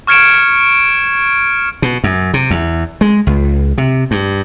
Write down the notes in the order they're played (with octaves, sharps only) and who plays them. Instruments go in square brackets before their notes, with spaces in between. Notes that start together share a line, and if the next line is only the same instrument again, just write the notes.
[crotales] C#6 F6 G#6 C#7 D7 E7
[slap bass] B2
F#2
C3
E2
G#3
C#2
C3
G2